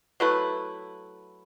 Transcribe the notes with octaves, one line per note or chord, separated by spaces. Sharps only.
F#3 A3 E4 B4